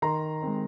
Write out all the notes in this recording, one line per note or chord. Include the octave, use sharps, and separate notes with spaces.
D#3 A#5 C6
G#3 C4